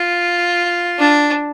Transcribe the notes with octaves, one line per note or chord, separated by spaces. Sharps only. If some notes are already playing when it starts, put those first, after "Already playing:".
Already playing: F4
D4